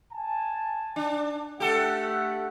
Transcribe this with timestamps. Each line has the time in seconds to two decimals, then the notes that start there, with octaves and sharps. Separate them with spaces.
0.13 G#5 A5
0.96 D4
1.60 A3 G4 A4 F#5